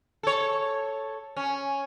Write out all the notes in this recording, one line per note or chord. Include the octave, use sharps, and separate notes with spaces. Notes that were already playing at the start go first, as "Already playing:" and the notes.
A4 C#5
C#4